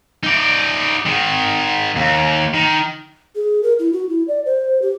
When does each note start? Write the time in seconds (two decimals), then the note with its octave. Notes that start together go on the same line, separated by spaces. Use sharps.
0.24 D#4 D5
1.06 D#3 G#3
1.96 D#2
2.54 D#3
3.35 G#4
3.63 A#4
3.79 E4
3.93 F#4
4.09 E4
4.28 D5
4.46 C5
4.82 G4